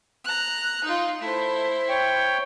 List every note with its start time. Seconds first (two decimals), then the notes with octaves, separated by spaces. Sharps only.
0.24 A#5 F#6
0.84 D#4 F4
1.21 A3 E4 C5
1.89 C#5 G5